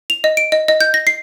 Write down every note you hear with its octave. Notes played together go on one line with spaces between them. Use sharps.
F7
D#5
D7
D#5
D#5
G6
A#6
C7